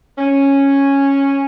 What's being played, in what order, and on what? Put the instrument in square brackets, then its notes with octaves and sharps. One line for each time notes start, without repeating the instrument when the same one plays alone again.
[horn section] C#4